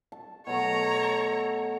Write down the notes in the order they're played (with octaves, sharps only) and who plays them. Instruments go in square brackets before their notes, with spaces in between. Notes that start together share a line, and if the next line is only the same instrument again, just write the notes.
[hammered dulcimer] A5
[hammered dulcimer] B2 F#3 A3 [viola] C#5 A#5